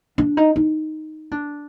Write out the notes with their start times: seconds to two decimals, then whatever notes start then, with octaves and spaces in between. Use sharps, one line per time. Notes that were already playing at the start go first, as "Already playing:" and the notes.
0.18 D4
0.37 D#4
0.56 D#4
1.32 D4